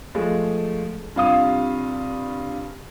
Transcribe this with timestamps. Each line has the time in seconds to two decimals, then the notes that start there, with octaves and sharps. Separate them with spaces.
0.15 F3 G#3 A3
1.16 G2 C3 F4 F5 D#6